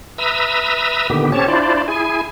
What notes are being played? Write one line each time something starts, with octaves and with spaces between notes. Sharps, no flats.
B4 E5 A#5 D#6 E6
A#2 D3 D#3 B3 G4
C4 C#4 G4 C#5 A5
D4 E4 F4 C5 D5
E4 G#4 G#5